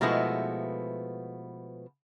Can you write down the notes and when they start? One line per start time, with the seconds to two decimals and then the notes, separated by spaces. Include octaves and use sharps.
0.01 B2 F3 G#3 A3 B3 E4